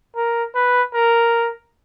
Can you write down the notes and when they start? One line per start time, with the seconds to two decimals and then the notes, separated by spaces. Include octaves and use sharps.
0.16 A#4
0.55 B4
0.94 A#4